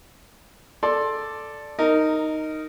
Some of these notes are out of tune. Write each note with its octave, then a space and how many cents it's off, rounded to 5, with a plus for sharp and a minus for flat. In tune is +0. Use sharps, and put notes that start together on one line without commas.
A4 +0 D5 +0 C6 +15
D#4 +0 A#4 -15